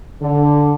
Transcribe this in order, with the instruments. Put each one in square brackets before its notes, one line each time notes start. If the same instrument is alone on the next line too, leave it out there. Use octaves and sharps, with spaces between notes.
[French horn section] D3